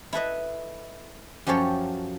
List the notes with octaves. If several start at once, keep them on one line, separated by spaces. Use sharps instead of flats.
E4 A4 B4 D#5
F#2 F3 G4 A4 C#5